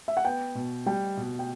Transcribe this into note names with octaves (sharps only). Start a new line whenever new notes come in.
E5
F#5
B3 G5
B2
G3 G5
B2
G5